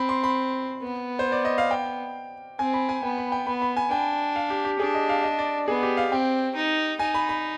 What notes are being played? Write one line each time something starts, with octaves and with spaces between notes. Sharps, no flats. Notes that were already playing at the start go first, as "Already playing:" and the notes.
Already playing: C4 B5
C6
B5
B3
C5
D5
D#5
F5
G5
C4 G#5
B5
G#5
B3 G5
B5
G5
B3 B5
B5
G#5
D4 G5
F5
G4
G4
D4 G#4
D#5
F5
D#5
D5
B3 G#4
G4
F5
C4 G5
D#4
D#4 G#5
B5
B5